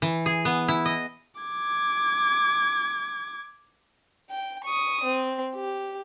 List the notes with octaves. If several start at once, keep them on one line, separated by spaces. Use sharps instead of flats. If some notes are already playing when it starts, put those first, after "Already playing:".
E3
G#4
B3
E4
D#5
D6 G#6
G5
C#6 D#6
C4
G4